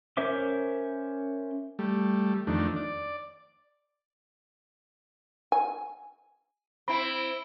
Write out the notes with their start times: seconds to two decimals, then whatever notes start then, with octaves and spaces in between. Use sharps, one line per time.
0.17 C#4 A#4 C5 E5 D6
1.79 G3 A3
2.47 F2 D#3 A3 D4
2.76 D5
5.52 G#5
6.88 C4 E4 B5